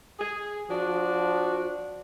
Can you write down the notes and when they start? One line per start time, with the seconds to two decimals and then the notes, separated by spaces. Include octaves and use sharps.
0.19 G#4
0.69 F3 D4 F#4